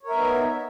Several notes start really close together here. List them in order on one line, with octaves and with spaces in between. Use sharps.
C#5 A#4 E5 B3 D#4